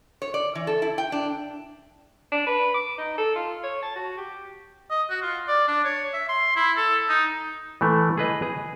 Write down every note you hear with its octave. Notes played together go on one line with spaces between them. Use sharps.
C#5
D5
E3
A4
E4
G5
D4
D4
B4
D6
D#4
A4
F4
C#5
A5
F#4
G4
D#5
F#4
F4
D5
D4
C#5
E5
C6
E4
A4
D#4
E3 A3
G#4 B4 D#5
G#4